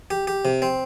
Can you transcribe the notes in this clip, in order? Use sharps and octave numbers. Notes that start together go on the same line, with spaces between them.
G4
G4
C3
C4